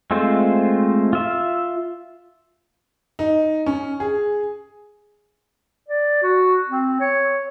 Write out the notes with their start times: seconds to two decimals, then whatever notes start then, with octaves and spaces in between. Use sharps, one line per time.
0.11 G#3 A3 C4 F4 C5
1.13 F4 E5
3.19 D#4
3.66 C#4
4.00 G#4
5.88 D5
6.22 F#4
6.69 C4
7.01 C#5